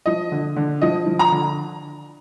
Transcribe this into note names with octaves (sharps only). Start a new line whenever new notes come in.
F3 D#5
D3
D3
F3 D#5
F3
A#5
D3